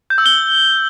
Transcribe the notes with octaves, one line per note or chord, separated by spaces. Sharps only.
G6
E6
G7